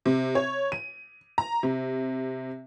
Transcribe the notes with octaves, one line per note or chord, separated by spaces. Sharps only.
C3
C#5
D#7
A#5
C3